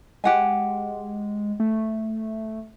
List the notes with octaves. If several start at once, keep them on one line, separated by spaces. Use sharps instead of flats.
G#3 G4 F#5 G#5
A3